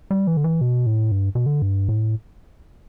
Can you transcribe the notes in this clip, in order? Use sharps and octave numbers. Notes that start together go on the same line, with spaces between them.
G3
E3
D3
E3
B2
A2
G2
B2
D3
G2
A2